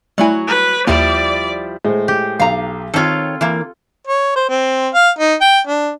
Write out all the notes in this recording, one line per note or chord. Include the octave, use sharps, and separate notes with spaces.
F#3 G3 A3 E4 F#4 G#5
B4
D#2 F3 G3 A#3 E4 D5
A2 G#3 C5
G4
B1 F5 A#5
D#3 C4 F4 A4 C#5
E3 A#3
C#5
C5
C4
F5
D#4
G5
D4